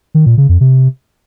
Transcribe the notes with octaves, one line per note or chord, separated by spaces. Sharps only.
D#3
A#2
C#3
F2
C3